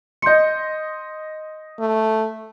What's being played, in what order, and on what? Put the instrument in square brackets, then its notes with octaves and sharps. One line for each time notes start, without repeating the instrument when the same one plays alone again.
[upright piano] D#5 C6 [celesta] G6 C#7
[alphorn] A3